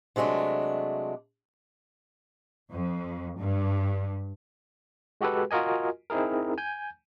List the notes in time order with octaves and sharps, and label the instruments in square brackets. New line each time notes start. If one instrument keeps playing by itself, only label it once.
[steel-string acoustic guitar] C3 F#3 G#3 A3 D4
[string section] F2
G2
[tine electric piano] G#3 F#4 G4 A4 B4
F4 F#4 A#4 D#5 G#5
C4 D#4 E4 G#4 A#4
G#5 G6